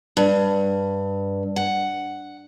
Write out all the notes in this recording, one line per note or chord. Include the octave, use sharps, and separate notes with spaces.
G2
F#5